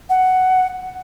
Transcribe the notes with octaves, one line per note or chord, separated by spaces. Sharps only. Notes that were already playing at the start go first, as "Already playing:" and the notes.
F#5